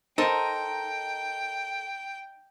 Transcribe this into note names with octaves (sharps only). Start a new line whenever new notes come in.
D#4 A4 A#4 C5 D#5 G5 C6